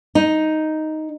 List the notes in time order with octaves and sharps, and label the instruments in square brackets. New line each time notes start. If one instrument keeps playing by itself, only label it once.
[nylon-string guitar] D#4